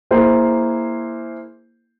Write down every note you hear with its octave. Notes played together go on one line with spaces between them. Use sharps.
A#3 E4 G#4 C5